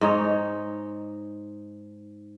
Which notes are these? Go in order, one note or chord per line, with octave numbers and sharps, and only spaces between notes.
G#2 D#4 C#5